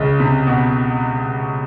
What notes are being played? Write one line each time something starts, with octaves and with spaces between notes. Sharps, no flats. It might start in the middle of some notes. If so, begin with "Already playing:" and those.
Already playing: C#2 C#3
C3
B2